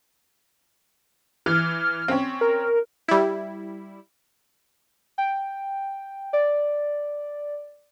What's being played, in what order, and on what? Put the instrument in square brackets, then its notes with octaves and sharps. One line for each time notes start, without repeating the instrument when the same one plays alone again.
[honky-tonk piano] E3 [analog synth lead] F6
[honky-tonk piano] C4 C#4
[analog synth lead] A#4
[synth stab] G3 E4
[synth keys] G5
D5